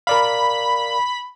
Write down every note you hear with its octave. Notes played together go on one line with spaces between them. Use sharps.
A#4 D5 F5 B5